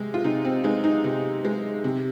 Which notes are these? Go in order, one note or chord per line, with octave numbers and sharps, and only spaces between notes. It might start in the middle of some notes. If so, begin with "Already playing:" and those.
Already playing: C3 G#3
F4
C3 D#4
C4
G#3 D#4
D#4
C3
G#3
C3